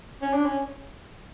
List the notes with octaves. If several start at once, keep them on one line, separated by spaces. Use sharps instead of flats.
C#4
D4
C#4